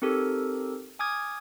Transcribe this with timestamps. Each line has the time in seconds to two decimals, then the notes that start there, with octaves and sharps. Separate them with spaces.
0.02 C4 D#4 G4 A4 A#4
0.99 G#5 D6 D#6 F6 G#6